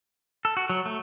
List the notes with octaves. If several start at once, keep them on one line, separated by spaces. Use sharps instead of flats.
A4
F#4
F#3
A3